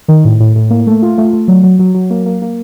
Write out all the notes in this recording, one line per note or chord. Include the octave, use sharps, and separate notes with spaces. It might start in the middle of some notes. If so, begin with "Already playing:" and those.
D#3
A2
A2
A2
A#3
A3
F4
A3
A3
F#3
F#3
F#3
F#3
A#3
A#3
A#3